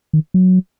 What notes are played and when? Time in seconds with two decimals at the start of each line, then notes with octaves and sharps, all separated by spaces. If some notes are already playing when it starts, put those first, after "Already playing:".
0.13 D#3
0.34 F#3